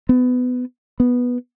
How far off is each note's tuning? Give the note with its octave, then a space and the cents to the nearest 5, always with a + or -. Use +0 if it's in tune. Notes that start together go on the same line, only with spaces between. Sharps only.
B3 +20
B3 -5